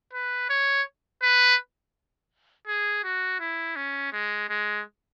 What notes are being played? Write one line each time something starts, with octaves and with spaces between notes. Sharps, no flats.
B4
C#5
B4
G#4
F#4
E4
C#4
G#3
G#3